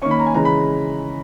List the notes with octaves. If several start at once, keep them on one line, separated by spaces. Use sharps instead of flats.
D#3 A#3 C#4 C#6
B5
A#5
G#5
C#3 E3 G#3 C#4 A#5
B5